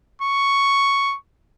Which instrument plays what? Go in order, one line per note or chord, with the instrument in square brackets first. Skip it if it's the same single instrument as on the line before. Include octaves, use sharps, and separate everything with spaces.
[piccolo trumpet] C#6